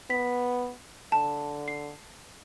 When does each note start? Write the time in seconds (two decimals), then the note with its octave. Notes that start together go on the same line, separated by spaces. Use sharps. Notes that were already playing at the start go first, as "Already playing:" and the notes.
0.10 B3 B6
1.12 D3 A5
1.68 C7